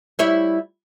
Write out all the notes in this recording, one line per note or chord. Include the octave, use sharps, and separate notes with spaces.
G3 E4 C#5